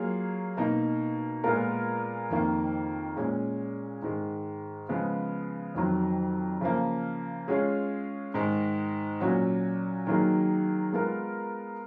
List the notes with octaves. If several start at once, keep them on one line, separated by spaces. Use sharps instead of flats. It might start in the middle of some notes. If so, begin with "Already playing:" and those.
Already playing: F#3 A#3 F4 G#4 C#5
B2 A#3 D#4
A#2 G#3 B3 F4 A#4
F2 D#3 A#3
A#2 G#3 C#4
G#2 D#3 G#3
C#3 F3 G#3 B3
F2 D#3 F#3
C#3 F3 A#3
G#3 C#4 F4 G#4 C#5
G#2 D#3 G#3
A#2 F#3 C#4 F#4
D#3 F#3 A#3 D#4 G#4
G#3 B3 F4 A#4